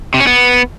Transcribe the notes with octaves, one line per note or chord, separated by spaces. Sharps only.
C3
C#4
B3